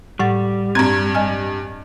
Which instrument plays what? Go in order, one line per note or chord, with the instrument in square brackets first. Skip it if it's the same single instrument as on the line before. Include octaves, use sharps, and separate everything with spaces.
[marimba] A2 F#5 A6 [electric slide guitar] G3
[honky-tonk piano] G2 G#6 [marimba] C4 A#5
[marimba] D#5 G#5 F6